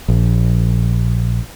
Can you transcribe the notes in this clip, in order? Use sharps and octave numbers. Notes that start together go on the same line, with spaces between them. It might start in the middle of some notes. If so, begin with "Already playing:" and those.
A#1